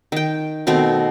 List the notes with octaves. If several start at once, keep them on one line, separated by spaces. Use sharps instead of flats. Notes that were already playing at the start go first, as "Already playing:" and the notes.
D#3 G5
B2 D#3 A3 C4